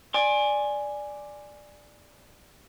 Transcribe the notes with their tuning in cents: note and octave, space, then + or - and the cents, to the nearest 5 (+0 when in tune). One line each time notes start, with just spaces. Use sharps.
D5 +5 G#5 +0 C6 +40